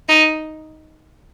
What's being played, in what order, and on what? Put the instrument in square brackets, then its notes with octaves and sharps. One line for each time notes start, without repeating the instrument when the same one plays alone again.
[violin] D#4